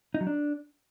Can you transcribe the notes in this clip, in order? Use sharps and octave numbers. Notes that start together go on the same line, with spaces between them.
D#4
F#3
D4